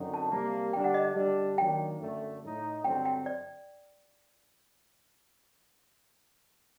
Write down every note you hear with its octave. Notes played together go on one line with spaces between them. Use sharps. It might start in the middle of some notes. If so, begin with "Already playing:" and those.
Already playing: F#2 D3 F#3 C4 D#4
A5
C3 G3 A#3
D3 G3 D4 G5
F#5
D#5
D#5
D3 G3 D4
D#3 F#3 A#3 D4 G5
F#2 D3 A3
A2 A3 D#4
G2 D3 F#3 C4 G5
G5
D5